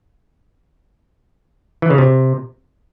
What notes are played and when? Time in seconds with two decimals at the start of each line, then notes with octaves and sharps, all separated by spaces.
1.82 E3
1.90 C#3
1.98 C3